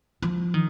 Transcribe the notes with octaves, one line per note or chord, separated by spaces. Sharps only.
F3
D#3